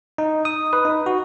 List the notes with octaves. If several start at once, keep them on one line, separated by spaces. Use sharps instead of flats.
D#4
D#6
B4
D#4
F#4